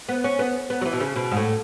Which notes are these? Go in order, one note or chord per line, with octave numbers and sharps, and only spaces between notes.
B3
C#4
B3
B3
F#3
E3
B2
C#3
B2
G#2
A2